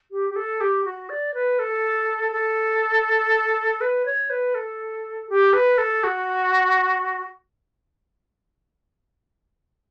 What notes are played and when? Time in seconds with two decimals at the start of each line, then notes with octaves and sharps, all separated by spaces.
0.11 G4
0.29 G4
0.36 A4
0.60 G4
0.84 F#4
1.09 D5
1.34 B4
1.59 A4
2.32 A4
3.81 B4
4.05 C#5
4.30 B4
4.54 A4
5.29 G4
5.53 B4
5.78 A4
6.03 F#4